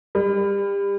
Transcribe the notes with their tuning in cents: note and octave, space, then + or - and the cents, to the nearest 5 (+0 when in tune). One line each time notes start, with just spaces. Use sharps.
G3 +30